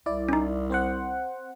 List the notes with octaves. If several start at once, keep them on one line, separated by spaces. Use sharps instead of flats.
C2 E4 D5
C#4 D#4
C4 C5 F#5